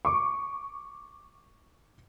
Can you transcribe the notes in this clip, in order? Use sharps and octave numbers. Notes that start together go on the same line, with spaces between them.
C#6 D6